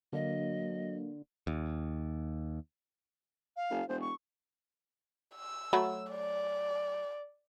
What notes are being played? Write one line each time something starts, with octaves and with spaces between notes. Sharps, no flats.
D3 F#3 A#3 D#5
D#2
F5
F#1
E1 C5
C#6
E6
F#3 A3 B5
D5